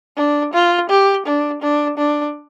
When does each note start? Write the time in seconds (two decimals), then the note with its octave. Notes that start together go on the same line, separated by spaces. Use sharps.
0.17 D4
0.53 F4
0.90 G4
1.26 D4
1.62 D4
1.98 D4